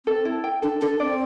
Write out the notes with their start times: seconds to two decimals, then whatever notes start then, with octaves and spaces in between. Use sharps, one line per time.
0.06 C4 A4
0.25 E4
0.44 G5
0.62 D4 A4
0.81 D4 A4
1.00 C4 D5